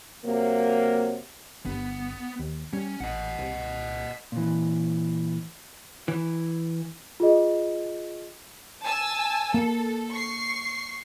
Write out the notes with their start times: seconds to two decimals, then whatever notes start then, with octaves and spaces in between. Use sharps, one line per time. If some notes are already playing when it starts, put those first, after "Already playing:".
0.25 C3 F#3 A#3
1.66 G1 B3
2.39 D#2
2.73 G3 C#4
3.00 A1 D#5 F#5
3.38 C2
4.32 A#2 E3
6.08 E3
7.20 F4 G#4 D#5
8.84 G#5 A5 E6
9.54 A#3 A4
10.12 C#6 C7